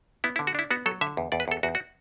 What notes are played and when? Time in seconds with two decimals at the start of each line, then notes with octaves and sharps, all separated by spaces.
0.24 B3 E4
0.36 E4
0.39 D3
0.47 F#4
0.55 D4 E4
0.71 B3 F#4
0.86 F#3 A4
1.01 D3 E5
1.17 E2
1.32 E2 D5
1.40 B4
1.48 E2 A4
1.63 E2 F#4
1.75 F#4